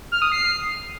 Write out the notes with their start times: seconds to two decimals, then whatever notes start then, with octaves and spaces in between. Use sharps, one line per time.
0.12 F6
0.22 D#6
0.32 C7